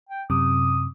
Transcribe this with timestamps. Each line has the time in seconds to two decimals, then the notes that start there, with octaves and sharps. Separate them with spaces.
0.09 G5
0.30 F#2 C3 D6 D#6